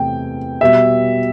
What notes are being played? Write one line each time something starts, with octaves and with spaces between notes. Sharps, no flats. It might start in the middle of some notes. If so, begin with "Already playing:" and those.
Already playing: E2 C3 A3 G5
B2 G3 E5